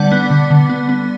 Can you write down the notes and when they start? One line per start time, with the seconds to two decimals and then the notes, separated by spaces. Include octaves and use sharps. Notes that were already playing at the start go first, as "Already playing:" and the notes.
Already playing: D3 G3 B3 D5 F#5
0.12 B3
0.30 D3
0.50 D3
0.69 B3
0.89 B3